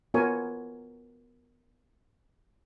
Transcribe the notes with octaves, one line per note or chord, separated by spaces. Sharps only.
B3 F4 A#4 C#5 G#5